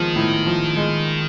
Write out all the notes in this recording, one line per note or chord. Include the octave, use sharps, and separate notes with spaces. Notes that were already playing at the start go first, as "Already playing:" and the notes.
Already playing: D#3 F3 G#3
A2
F3
G#3